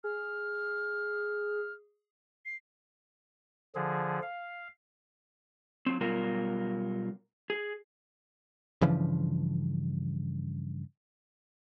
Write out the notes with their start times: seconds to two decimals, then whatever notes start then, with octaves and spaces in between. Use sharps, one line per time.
0.04 G#4 F6
2.45 C7
3.75 D3 F3 G#4
4.22 F5
5.86 F#3 C4
6.01 B2 F#3 G3 B3 F4 A#4
7.50 G#4
8.81 G2 C#3 E3 F3